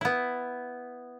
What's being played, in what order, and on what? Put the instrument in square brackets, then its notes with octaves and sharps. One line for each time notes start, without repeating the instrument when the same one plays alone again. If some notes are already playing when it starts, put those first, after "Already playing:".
[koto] B3 E4